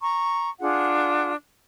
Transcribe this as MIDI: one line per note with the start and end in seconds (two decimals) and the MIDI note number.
0.01 0.49 82
0.01 0.49 85
0.60 1.32 62
0.60 1.32 65
0.60 1.32 68
0.60 1.32 78